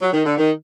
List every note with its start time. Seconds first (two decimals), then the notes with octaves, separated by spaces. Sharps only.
0.01 F#3
0.13 D#3
0.26 D3
0.38 D#3